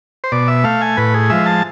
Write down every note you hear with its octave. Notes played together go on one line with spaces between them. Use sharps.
C5
B2 D5
E5
A3 F5
G#5
A2 B4
G#4
F3 G#3 E5
A5